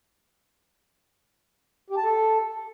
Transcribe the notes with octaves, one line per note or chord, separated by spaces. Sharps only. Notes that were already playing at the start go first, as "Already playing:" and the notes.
G4
A5
A4